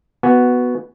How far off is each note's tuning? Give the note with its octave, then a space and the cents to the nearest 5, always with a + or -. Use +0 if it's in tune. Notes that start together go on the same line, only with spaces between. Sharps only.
B3 +0 F#4 +0 G#5 +0